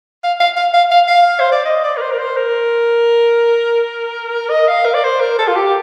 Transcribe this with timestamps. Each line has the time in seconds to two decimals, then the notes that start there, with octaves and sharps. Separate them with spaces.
0.24 F5
0.40 F5
0.57 F5
0.74 F5
0.91 F5
1.08 F5
1.40 C5
1.52 D5
1.65 D#5
1.84 D5
1.97 A#4
2.02 C5
2.11 A#4
2.19 C5
2.37 A#4
4.50 D#5
4.68 F5
4.85 A#4
4.94 D5
5.04 C5
5.21 A#4
5.39 A4
5.48 F4
5.56 G4